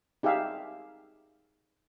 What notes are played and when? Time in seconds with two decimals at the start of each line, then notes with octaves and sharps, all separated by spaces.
0.23 D#4 G4 G#4 E5 F5